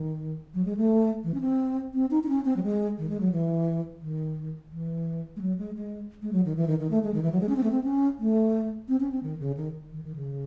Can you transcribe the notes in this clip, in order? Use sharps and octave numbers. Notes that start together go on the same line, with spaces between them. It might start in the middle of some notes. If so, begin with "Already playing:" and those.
Already playing: D#3
F#3
G#3
A3
E3
C#4
C4
C4
D#4
D#4
C#4
C4
F#3
G#3
D#3
G#3
F#3
E3
D#3
E3
G#3
F#3
G#3
G#3
G#3
F#3
D#3
E3
D#3
D#3
A3
G#3
D#3
E3
F#3
G#3
C#4
C4
A3
C4
C#4
A3
C4
C#4
C4
D#3
C#3
D#3
D#3
D#3
C#3